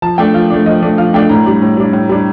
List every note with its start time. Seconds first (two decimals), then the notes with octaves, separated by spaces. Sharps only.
0.02 F3 A5
0.18 A3 D4 G5
0.34 F3 F5
0.50 A3 D4
0.66 F3 D#5
0.82 A3 D4
0.98 F3 F5
1.14 A3 D4 G5
1.29 A2 A#5
1.46 G3 D4
1.62 A2
1.77 G3 D4
1.93 A2
2.09 G3 D4